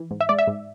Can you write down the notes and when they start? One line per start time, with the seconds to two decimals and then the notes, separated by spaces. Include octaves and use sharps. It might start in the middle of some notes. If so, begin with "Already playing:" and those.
Already playing: E3
0.11 G#2
0.21 E5
0.29 G#3 D5
0.38 E5
0.47 G#2